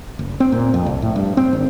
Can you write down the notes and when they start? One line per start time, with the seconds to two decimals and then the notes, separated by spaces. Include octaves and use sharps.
0.19 F#1
0.40 C4
0.52 A#2
0.74 F2
0.86 C2
1.02 A2
1.16 G2
1.37 C4
1.53 G#1